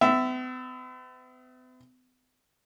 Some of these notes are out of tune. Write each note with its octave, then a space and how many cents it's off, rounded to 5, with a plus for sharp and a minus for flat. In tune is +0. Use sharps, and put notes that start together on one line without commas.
B3 +45 E5 +0